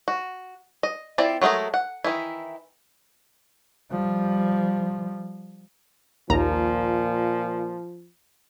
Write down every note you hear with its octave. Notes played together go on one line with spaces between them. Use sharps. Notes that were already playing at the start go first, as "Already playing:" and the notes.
F#4
D#5
C4 E4 F4 D5
F#3 G#3 A3 G#4 A#4
F#5
D#3 E3 E4
F3 G3
A#1 D#2 A#2 F3 A#5